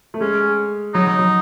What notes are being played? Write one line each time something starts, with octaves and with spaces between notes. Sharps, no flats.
A3
G#3 C#4
F#3 D#4
F#3
F#3